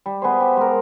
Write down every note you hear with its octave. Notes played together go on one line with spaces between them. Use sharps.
G3
B3 G#4 C5
G4
G#3 A#4